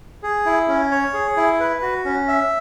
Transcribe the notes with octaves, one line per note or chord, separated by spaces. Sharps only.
G#4
E4
C#4
C#5
G#4
E4
B4
F#4
C#4
E5